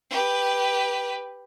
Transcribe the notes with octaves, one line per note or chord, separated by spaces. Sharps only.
G4 B4